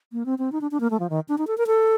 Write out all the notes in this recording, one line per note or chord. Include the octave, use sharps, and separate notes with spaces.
A#3
C4
C4
D#4
D4
D4
A#3
A3
F3
D#3
D4
D#4
A4
A#4
A4